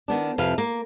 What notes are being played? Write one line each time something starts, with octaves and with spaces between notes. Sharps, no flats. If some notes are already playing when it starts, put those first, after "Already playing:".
D#3 B3 D4
F2 C3 B4 F5
A#3